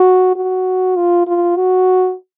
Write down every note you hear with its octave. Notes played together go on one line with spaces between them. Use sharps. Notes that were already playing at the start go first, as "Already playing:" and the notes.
Already playing: F#4
F#4
F4
F4
F#4